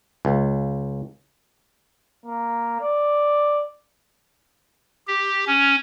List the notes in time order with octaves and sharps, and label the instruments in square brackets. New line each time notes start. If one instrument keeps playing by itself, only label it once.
[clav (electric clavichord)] C#2
[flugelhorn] A#3
D5
[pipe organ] G4
C#4